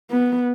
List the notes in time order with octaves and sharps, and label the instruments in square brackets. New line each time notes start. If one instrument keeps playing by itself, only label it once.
[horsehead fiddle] B3